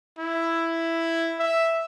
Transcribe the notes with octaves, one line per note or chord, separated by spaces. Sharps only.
E4
E5